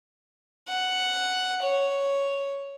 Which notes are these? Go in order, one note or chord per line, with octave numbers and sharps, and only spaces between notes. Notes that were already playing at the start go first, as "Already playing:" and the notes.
F#5
C#5